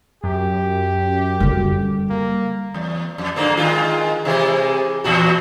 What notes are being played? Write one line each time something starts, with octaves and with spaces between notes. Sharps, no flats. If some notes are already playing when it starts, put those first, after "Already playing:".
F#2 G4
D3 G3
A#3
E2
F2
G#2 D3 A#3
D#3 G#3 F4
C3 E3 G#3
E2 A#2 F#4